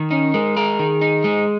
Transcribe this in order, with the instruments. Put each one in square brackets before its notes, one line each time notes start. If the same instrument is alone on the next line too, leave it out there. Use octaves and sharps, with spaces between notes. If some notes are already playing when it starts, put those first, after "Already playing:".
Already playing: [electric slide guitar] D#3
[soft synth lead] C#4 [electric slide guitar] D#4
[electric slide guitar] G#3 [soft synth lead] A#4
[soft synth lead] G#4 [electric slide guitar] A#4
[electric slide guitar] D#3
D#4
G#3